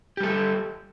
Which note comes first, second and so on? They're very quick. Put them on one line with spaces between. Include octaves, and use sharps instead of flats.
G4 G3 A4